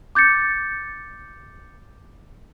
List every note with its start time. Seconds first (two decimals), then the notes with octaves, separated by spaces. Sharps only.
0.15 D6 G6 A6 C#7